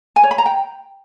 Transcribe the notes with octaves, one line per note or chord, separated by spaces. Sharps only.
G#5
C#5
B5
A#5
G5